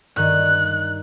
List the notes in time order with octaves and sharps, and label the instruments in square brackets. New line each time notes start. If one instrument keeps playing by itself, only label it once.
[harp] G2 D#3 [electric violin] F#6